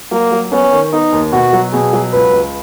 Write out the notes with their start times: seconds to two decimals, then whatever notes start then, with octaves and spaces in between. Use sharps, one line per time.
0.12 F#3 A#3
0.32 F#3
0.52 B3 C#4
0.72 D#3
0.93 B3 D#4
1.12 D#2
1.32 B2 F#4
1.53 F#3
1.73 B2 G#4
1.93 F#3
2.13 C#2 B4
2.33 C#2